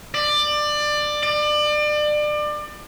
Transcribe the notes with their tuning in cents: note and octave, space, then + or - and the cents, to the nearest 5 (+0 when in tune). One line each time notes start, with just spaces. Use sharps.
D5 +20
D5 +30